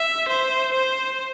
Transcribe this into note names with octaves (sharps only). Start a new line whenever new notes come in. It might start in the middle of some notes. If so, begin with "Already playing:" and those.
Already playing: E5
C5
C5